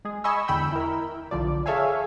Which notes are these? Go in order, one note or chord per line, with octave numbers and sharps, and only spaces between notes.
G#3 G#4
D#5 G#5 B5 C#6 E6
E2 D3 G5 B5 E6 G6
E4 A#4
B1 D3 F3 D5
G#4 A4 C#5 E5 F5 G#5